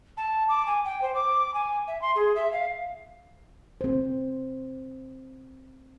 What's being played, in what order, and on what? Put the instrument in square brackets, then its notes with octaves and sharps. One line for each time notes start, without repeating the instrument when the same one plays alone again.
[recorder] A5
D6
G#5
G5
C5
D6
G#5
E5
C6
G#4
E5
F5
[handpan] C4 C5